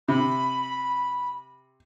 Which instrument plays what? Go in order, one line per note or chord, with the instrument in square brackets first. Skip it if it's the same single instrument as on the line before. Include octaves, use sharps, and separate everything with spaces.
[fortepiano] C3 [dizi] B5